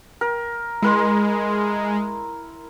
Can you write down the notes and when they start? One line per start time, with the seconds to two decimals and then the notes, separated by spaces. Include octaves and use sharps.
0.21 A#4
0.82 G#3 E4 A#4 C6